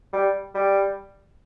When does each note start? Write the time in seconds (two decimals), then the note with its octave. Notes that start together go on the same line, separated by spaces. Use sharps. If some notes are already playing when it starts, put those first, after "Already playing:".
0.13 G3
0.55 G3